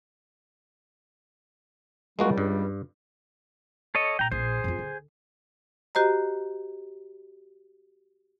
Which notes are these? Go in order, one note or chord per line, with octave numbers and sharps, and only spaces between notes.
C#2 G3 G#3 A#3 F#4
G2
A4 C#5 D#5
A#2 G5 A#5
A#1 G#4 C5
F2 F4
D3
F#4 G4 C5 D#5 A#5